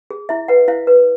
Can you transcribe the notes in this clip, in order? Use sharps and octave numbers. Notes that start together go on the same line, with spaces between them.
G#4
E4 E5
B4 F#5
E4 F5
B4